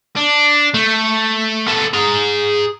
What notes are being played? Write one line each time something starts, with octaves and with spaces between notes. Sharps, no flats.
D4
A3
B3 A4
G#4 A#5